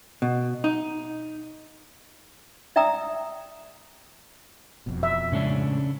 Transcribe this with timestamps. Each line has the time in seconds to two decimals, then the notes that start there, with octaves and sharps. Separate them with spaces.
0.22 B2
0.64 D#4
2.76 D5 E5 G5 A#5 D#6 E6
4.86 E1 F2 B2
5.03 E5
5.32 A2 C#3 G#3 C#4 D4